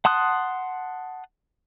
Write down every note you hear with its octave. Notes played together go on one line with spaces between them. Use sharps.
F#5 A5 C6 D#6 F#6